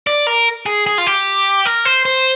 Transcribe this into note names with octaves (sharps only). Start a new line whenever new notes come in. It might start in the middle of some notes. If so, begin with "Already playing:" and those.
D5
A#4
G#4
G#4
F4
G4
A#4
C5
C5